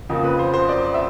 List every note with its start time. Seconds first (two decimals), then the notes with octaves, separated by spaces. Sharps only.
0.09 F2 C#3 F3 A#3
0.24 B4
0.39 C5
0.54 C5
0.69 D5
0.94 E5